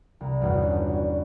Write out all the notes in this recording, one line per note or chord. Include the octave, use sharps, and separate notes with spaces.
C2 A#5
G1 E2 F#4 C#5 F#5
C#4 D4
F#4